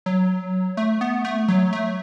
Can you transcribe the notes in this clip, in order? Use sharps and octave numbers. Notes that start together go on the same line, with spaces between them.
F#3
A3
B3
A3
F#3
A3